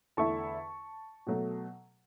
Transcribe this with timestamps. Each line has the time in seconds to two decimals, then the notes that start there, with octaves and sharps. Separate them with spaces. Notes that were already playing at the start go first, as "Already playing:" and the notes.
0.17 E2 D3 A3 E4 A5 C#6
1.27 B2 F#3 A3